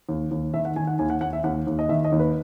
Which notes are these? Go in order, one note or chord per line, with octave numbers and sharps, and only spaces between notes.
D#2
D#2
D#3 E5
F#5
D#3 G#5
F#5
D#2 G#5
F#5
D#2 F#5
E5
D#2 F#5
D#2
D#5
D#3 E5
D#5
D#2
B4